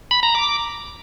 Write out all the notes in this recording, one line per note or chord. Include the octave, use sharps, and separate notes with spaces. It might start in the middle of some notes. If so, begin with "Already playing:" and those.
B5
A#5
D6